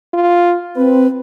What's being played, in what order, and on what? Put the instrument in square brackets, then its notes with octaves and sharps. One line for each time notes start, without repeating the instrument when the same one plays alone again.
[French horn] F4
[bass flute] C4 [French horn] B4